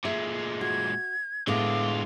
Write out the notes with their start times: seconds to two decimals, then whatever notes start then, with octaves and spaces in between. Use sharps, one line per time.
0.05 A#2 G#3 E5
0.61 F#4 G#6
1.47 A2 D3 G#3 B3 F4 D6